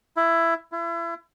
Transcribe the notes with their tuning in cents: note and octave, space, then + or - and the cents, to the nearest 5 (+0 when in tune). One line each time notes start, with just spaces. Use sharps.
E4 +15
E4 +35